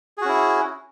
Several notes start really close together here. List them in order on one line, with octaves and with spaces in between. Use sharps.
G#4 F#4 C#4 E4